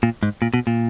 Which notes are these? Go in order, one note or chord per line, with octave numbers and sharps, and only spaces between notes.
A#2
G#2
A#2
B2
A#2